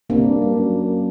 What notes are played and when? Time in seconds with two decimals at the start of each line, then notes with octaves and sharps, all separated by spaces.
0.10 C3 A#3 D4
0.25 G2
0.41 G2
0.56 F#2